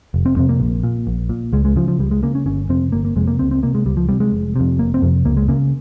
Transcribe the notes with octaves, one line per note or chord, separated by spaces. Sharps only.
F1
C4
F2 C3 C4
A#3
A#1
A#2
A#1
A#2
C#2 G#3
G#3
C#3 F3
F3
C#2 G3
G#3
C#3 A#3
C#4
G1 C#4
F2 C3 C4
G1 A#3
A#3
F2 C3 G#3
A#3
C#2 C4
C4
C3 A#3
G#3
C#2 G3
F3
C3 G3
G#3
F1
F2 C3
F1 A#3
C4
F2 C3
C#2 A#3
G#3
C#3 A#3